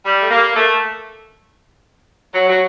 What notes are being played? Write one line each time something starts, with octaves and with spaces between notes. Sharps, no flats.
G3
A3
A#3
A3
F#3
F#3